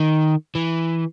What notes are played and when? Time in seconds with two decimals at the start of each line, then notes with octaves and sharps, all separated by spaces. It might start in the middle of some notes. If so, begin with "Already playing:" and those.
Already playing: D#3
0.55 E3